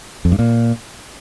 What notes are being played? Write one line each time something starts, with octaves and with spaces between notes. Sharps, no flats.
F2
G2
A#2